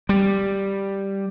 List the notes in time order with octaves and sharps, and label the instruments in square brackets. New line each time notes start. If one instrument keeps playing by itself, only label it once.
[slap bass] G3